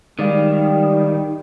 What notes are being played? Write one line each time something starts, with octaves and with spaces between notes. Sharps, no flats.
D#3 G3 G#3 D5 F5